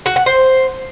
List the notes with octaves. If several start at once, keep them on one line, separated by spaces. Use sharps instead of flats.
F#4
F#5
C5